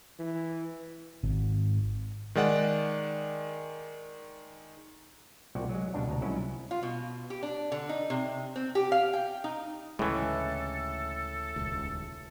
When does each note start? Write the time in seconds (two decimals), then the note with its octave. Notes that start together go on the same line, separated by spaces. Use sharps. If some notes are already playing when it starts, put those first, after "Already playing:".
0.19 E3
1.23 G#1
2.35 D#3 G#3 D5 F#5
5.55 C2 A#2 F#4 D5 F#5 G5
5.70 F#3 G#3
5.94 C#2 B2 G3 D4 F#5
6.07 D2 B2 A#5
6.21 C2 F#3 G#3 C#4 E4 F#5
6.71 F4
6.83 B2
7.30 G4
7.43 D4
7.72 D3
7.89 D#4
8.10 C3
8.56 C4
8.75 G4
8.92 F5
9.13 G5
9.44 D#4
9.99 D2 A2 C#3 E3 G#3 A4
11.56 D#1 C#2